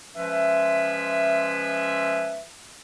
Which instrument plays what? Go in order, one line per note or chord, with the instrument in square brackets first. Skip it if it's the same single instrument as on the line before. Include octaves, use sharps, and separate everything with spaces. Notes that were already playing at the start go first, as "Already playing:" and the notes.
[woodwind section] F3 G#3 C#4 B4 E5